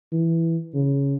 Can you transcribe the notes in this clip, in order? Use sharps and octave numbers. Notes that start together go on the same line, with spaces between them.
E3
C#3